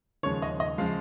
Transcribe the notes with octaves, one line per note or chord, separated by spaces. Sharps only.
D#2 C#3 F3 G#3 C#5
D#5
D#5
C#3 F3 G#3 F5